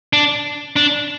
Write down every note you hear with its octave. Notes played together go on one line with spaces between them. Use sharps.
D4
D4